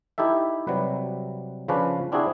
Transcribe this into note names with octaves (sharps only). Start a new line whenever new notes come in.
D#4 E4 G4 A4 E5
C3 F#3 G3 B4
C#3 F3 C#4 D4 B4
C4 D4 E4 F#4 G#4